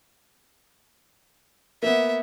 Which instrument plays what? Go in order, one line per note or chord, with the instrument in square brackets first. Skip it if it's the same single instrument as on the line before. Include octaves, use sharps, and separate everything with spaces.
[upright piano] A#3 B3 [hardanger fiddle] E5